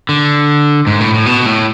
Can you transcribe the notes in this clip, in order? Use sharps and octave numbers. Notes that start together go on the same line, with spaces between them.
D3
G#2
A2
A2
B2
A2